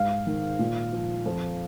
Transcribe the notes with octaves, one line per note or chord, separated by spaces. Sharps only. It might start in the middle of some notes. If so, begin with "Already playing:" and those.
Already playing: G#2 F5
D#3
A#2
F3
F2